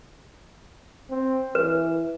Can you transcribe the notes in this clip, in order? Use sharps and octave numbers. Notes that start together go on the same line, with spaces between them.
C4
E3 B4